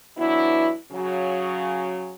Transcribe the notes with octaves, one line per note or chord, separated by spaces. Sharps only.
E3 F#3 B3 D4 E4
C#3 F#3